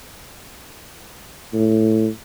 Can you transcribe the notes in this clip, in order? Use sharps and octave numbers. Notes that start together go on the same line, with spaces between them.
A2